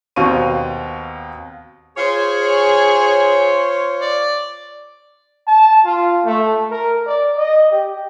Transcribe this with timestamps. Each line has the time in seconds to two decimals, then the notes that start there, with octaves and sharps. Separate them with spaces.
0.16 D#2 B2 C4 F5 C#6 D#7
1.97 F4 G#4 C5 C#5
4.01 D5
5.47 A5
5.85 F4
6.25 A3
6.71 A#4
7.07 D5
7.36 D#5
7.71 G4